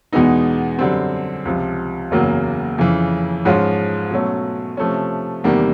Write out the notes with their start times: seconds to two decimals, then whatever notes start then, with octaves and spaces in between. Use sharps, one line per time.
0.12 E2 B2 G#3 B3 D#4
0.79 F#2 D3 G3 C4
1.45 C#2 C3 F3
2.11 F#1 E2 C#3 F#3 A#3
2.78 F2 C#3 E3
3.45 G#2 F3 G#3 C#4 F4
4.11 B2 F#3 A3 C#4
4.77 C3 F3 A3 C#4
5.44 E2 C3 D#3 G3 A#3